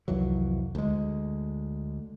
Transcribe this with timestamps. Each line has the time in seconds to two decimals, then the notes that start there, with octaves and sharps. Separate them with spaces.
0.08 C2 F2 E3 F#3
0.75 D2 G#3